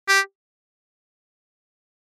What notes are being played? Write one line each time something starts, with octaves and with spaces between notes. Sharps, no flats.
G4